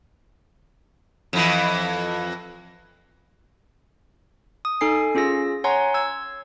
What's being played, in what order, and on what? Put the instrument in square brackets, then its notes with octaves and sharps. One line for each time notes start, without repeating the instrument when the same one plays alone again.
[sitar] F2 E3
[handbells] D#6
D#4 A4 G#5 C7
C#4 F4 G#4 E6 A#6
C#5 F#5 G#5 A#5 C6
E6 G#6